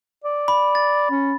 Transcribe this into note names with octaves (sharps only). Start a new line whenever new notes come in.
D5
B5
A6
C#4